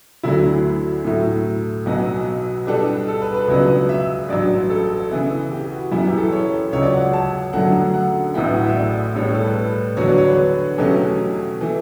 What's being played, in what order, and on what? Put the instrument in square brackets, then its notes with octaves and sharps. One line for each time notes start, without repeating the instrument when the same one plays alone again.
[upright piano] D2 D3 F#3 A3 [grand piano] E4
[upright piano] A2 F#3 A3 E4
B1 B2 F#3 B3 F#4
[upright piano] B2 G3 B3 D4 A4 [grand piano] G4
[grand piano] A4
B4
B4
[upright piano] C#2 C#3 F#3 B3 D4
[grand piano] E5
[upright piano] A1 G2 F#3 [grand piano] D5
[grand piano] A4
[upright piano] C#3 E3 B3 E4
[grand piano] G4
F#4
[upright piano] F#2 E3 B3 [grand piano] E4
[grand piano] G4
A4
C#5
[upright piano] C#2 C#3 F#3 [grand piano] C#5
[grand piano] D5
F#5
A5
[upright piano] F#2 D3 F#3 A3 [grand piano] F#5
[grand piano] F#5
[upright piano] A1 A2 F#3 B3 E4 [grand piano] G5
[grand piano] F#5
E5
D5
[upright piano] A2 G3 B3 [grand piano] C#5
[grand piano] B4
A4
B4
[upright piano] E2 D3 F#3 B3 F#4 [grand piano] C#5
[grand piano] D5
C#5
B4
[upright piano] E2 B2 F#3 A3 C#4 [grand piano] G4
[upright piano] E3 A3